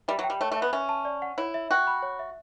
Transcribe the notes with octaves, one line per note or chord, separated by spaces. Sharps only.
G3 E5
F#3
G5
G3
A3 C#5
A3 E5
B3
C#4 E5
A5
D5
F#5
E4 C#5
E5
F#4 G5
B5
C#5
E5